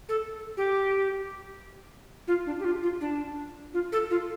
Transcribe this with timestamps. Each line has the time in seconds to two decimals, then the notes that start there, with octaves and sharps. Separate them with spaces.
0.09 A4
0.57 G4
2.27 F4
2.46 D4
2.60 G4
2.64 F4
2.83 F4
3.01 D4
3.74 F4
3.92 A4
4.10 F4